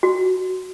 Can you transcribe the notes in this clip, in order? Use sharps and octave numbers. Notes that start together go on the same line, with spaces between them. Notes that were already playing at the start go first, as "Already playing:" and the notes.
F#4